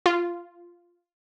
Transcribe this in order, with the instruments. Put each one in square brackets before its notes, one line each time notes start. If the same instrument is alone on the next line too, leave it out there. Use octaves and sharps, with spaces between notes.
[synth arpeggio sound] F4